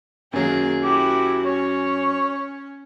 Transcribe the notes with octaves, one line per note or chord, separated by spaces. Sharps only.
F#2 D#3 F#3 A#3 G#4
E4 F#4 G4
C#4 C#5